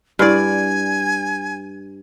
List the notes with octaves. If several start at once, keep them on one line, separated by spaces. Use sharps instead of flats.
G2 D4 E4 D5 G#5